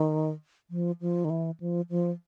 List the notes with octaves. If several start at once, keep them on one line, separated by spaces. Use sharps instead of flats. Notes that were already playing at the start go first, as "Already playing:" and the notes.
Already playing: D#3
F3
F3
D#3
E3
F3
F3